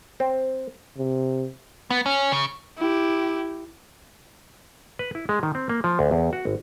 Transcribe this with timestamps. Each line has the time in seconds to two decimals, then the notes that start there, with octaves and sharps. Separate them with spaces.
0.20 C4
0.98 C3
1.90 B3
2.06 C#4
2.32 C#3
2.78 E4 G4
4.99 B4
5.15 E4
5.29 G#3
5.43 D#3
5.55 C4
5.69 A#3
5.84 F3
5.99 D2
6.11 E2
6.33 F#4
6.45 G#1